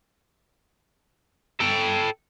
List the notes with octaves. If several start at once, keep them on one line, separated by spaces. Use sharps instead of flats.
A4 G5